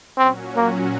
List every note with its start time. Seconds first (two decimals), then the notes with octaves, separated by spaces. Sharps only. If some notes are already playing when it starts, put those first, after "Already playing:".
0.18 A#2 F#3 C4 C#4 F#4
0.56 A#3